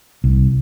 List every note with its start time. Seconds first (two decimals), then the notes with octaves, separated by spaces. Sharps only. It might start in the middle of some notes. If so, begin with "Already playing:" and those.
0.24 C2